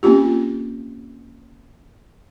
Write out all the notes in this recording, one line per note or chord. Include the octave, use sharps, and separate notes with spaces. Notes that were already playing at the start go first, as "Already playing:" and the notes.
A#3 C4 C#4 F4 G4